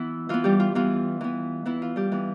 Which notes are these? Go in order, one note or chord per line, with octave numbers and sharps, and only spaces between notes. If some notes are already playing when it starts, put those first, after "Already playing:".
Already playing: E3 B3 E4
E3 B3 F4
G3 G4
F4
E3 B3 F4
E3 B3
E3 B3 E4
F4
G3 G4
E3 B3